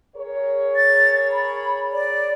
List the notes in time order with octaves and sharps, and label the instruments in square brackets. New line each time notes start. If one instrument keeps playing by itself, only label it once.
[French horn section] G#4 A#4 C#5
[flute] A6
B5
D5